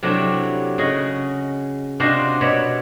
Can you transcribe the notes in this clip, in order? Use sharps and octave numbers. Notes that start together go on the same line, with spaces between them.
C3 F#3 A3 D4 E4 G4
C#3 F#4 G#4 D#5
C3 D4 F4 F#4 C5 D#5
B2 C#5 D5 E5 B5